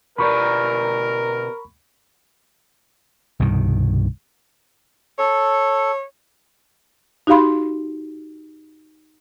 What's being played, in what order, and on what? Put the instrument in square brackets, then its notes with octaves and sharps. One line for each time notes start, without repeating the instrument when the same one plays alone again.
[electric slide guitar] B2 G4 D5 [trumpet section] A#4 [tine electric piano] B5 C#6
[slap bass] C2 G2 B2 D#3
[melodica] A4 [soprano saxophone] C#5
[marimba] D#4 F#4 G4 F5 B5 C6